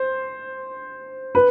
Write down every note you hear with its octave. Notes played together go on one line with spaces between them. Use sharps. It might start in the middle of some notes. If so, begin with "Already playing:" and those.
Already playing: C5
B4